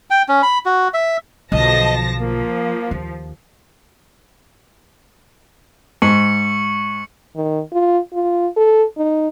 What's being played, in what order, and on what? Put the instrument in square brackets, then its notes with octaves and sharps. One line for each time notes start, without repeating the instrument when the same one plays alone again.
[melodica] G5
C#4
B5
F#4
E5
[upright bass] B1 D3 [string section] F3 A5 A#6 [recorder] D#5
[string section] F3 [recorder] A#3
[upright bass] D#2
[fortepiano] G#2 [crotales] C#6 C#7 F#7
[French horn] D#3
F4
F4
A4
D#4